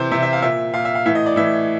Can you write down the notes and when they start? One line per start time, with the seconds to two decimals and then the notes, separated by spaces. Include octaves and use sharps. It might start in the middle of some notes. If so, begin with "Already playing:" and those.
Already playing: C3 E3 C5
0.11 C3 E3 E5
0.22 E5
0.33 F5
0.42 A#2 E5
0.73 A#2 F5
0.85 E5
0.95 F5
1.06 A2 E3 E5
1.15 D#5
1.26 D5
1.36 A2 E3 E5